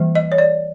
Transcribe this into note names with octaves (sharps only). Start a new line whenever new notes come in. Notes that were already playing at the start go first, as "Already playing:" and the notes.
Already playing: E3 G3 A#3
D#5
C#5
D5